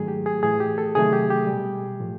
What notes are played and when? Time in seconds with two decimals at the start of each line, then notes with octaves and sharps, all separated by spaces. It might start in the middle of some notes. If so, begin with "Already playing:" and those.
Already playing: G#2 D#3 F#3 A3 G#4
0.08 G4
0.26 G#4
0.43 A2 E3 A3 G#4
0.60 G4
0.78 A4
0.95 C3 D#3 F#3 A3 G#4
1.13 G4
1.30 G4
1.47 G3
1.52 B2
2.00 A2 F3 A3